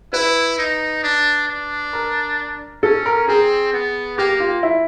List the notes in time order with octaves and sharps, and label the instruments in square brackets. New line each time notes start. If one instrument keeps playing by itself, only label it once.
[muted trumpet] E4 [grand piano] B4
[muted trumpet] D#4
D4
D4
[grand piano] A#4
[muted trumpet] C#4 [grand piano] A4
[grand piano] A#4
[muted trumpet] C4 [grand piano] G#4
[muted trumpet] B3
[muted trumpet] A#3 [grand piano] G4
[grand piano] F4
E4